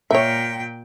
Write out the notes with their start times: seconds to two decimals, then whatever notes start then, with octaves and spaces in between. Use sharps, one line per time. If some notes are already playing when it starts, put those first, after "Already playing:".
0.11 A#2 C#5 E5 G5